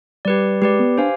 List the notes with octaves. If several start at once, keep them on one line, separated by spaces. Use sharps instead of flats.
G3 G4 B4 D5
G#3 G4 B4 D5
B3
D4 G4 C5 F5 G#5